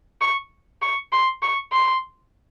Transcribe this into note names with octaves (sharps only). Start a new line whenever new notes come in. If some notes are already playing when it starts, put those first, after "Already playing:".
C#6
C#6
C6
C#6
C6